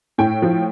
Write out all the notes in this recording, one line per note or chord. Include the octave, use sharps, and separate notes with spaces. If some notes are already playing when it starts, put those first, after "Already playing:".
A2 G5
F3